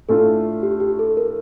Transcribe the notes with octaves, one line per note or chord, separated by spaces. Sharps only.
A2 A3 D4 F4 A4
G4
G4
A4
A#4